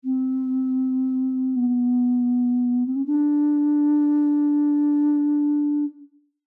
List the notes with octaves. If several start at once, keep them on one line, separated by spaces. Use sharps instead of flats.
C4
B3
C4
C#4
D4